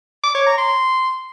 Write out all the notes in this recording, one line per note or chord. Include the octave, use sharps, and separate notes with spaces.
D6
C#5
A#5
C6